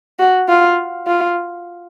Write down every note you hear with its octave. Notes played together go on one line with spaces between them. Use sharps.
F#4
F4
F4